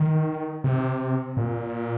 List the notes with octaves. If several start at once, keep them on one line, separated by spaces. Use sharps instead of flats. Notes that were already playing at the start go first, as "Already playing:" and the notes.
Already playing: D#3
C3
A#2